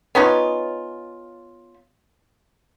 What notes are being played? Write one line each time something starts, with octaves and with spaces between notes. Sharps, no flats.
B3 C#4 D#4 F4